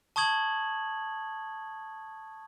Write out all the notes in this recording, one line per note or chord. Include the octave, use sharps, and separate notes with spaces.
A5 C#6 D#6 G#6 F#7